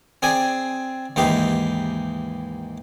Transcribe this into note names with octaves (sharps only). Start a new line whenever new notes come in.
C4 G#4 D5 G#5
D#2 G#2 E3 D#4 G4 C6